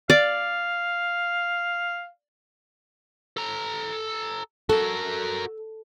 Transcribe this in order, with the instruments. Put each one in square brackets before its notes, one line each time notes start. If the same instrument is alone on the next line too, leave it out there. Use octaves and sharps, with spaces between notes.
[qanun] D5 [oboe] F5
[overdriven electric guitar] A4 A#5
[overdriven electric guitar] F#4 A#4 [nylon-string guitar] A4